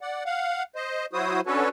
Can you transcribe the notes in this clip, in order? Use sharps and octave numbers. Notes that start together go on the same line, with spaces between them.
D5 F#5
F5 F#5
C5 D#5
F#3 E4 F#4 C5 D#6
C#4 D4 F#4 A4 B4 C#5